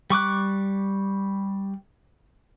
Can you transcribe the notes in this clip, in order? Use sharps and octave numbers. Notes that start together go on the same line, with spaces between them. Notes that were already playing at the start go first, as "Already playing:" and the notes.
G3 C#6 D6 F#6